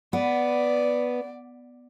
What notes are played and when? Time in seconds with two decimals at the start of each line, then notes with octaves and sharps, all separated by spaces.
0.13 B3 D5